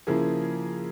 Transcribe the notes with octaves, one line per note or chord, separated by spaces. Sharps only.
C#3 F3 A#3 E4 G#4